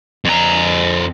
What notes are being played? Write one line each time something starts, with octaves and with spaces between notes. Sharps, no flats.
F2 A#5